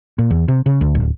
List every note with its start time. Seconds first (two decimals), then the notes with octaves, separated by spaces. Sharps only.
0.18 A#2
0.31 E2
0.48 C3
0.66 C#3
0.81 D2
0.95 D1